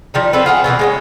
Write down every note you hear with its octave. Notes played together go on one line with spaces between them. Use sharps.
F3 G3 D#4
C4 F4 A4 B4
F4 G#4 F#5
B2 E3 A#3 G#4
G#3 C4 C#4